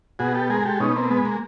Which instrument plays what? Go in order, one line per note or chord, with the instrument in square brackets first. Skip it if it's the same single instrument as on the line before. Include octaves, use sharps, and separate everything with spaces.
[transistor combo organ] B2 F#4 G#4
G4 A4
G#3 G#4 A#4
G4 A4
B2 C#4 D#4
A#3 C4
G#3 B3
A#3